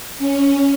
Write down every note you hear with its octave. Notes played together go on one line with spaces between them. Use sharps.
C#4